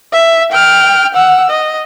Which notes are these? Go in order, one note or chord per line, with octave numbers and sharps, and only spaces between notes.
E5
G5 F6
F#5 E6
D#5